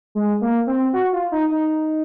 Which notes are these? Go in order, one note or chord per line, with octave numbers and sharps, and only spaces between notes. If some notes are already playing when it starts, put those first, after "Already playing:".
G#3
A#3
C4
F#4
F4
D#4
D#4